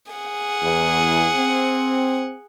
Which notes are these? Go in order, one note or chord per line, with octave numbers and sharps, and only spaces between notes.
G#4 F#5
E2
C4